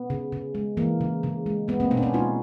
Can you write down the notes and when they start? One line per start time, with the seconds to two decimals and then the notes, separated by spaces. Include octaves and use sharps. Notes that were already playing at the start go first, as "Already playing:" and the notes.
Already playing: B3
0.10 C#3
0.32 C#3
0.55 G#3
0.77 E3 A#3
1.01 C#3
1.23 C#3
1.46 G#3
1.68 G#3 B3
1.80 A#3 C4
1.91 B2 B3 C#4
1.97 D4
2.02 B3 C#4
2.13 G#3 D#4 F4